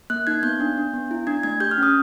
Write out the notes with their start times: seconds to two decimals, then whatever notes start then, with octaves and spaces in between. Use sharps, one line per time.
0.10 A#3 F#6
0.27 D#4 G#6
0.43 B3 G6
0.60 D4
0.77 D4
0.94 B3
1.11 E4
1.27 D4 G#6
1.43 A3 G#6
1.60 G4 G6
1.71 F6
1.78 C#4 D#6